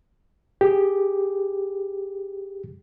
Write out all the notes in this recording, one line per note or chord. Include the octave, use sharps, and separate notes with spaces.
G4 G#4